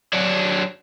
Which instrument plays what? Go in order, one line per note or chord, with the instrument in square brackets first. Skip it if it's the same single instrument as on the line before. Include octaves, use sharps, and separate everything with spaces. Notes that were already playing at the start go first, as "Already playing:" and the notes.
[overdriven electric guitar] F#3 D4